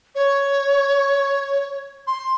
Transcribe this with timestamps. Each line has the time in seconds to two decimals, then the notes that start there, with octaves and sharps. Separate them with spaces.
0.15 C#5
2.07 C6